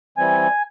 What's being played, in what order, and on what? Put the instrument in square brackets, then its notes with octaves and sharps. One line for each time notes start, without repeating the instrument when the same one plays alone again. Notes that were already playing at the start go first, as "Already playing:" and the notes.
[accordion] E3 G3 C4 G#5